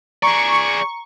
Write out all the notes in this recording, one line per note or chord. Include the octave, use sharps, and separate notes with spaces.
G#4 D5 A#5 C#6